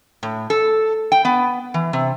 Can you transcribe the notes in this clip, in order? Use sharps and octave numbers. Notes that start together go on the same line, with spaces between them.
A2
A4
G5
B3
E3
C3